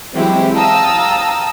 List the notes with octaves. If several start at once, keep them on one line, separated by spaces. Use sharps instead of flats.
E3 F#3 G#3 C4 E4 G4
F5 G5 A5 A#5 D#6 E6